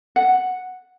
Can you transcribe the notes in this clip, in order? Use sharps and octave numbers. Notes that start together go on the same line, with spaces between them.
F#5